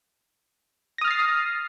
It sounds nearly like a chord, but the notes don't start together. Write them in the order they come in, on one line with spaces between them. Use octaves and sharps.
A#6 D#6 F6 A6 C7